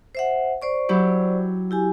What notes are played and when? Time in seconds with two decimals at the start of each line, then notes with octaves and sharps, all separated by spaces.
0.15 C5 E5 F#5
0.62 C5 D5 C#6
0.89 F#3 E4 G4
1.71 E4 G4 G#5